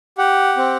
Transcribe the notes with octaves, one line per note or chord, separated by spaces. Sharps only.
G4 F#5
C4